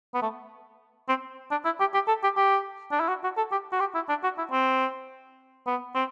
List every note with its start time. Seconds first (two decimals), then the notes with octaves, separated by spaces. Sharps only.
0.14 B3
0.22 A3
1.09 C4
1.51 D4
1.65 E4
1.80 G4
1.94 G4
2.08 A4
2.23 G4
2.37 G4
2.91 D4
3.00 E4
3.08 F#4
3.24 F#4
3.37 A4
3.52 G4
3.72 F#4
3.80 G4
3.95 E4
4.09 D4
4.23 F#4
4.38 E4
4.52 C4
5.67 B3
5.95 C4